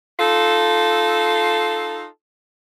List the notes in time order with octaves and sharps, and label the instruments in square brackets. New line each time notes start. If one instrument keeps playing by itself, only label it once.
[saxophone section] D#4 F4 A4